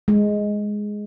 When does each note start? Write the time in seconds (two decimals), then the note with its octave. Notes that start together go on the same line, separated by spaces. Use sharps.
0.08 G#3